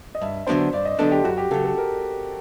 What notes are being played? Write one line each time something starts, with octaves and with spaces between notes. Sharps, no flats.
D#5
G2 E5
D3 F#3 B3 D4 C5
G2 D5
D#5
D3 F#3 B3 D4 A4
G4
F#2 F#4
G4
C#3 F#3 A4
A4
A#4